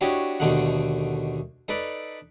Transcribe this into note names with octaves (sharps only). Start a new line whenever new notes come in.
D4 E4 F#4 G4 C#5 D#5
D#2 B2 D3 A3 D#4 F#5
D#4 A4 B4 D5